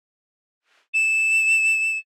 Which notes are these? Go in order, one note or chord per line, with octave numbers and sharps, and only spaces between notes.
E7